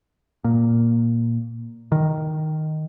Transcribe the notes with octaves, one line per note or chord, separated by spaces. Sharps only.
A#2
D#3